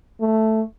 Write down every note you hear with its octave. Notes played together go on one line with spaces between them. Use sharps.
A3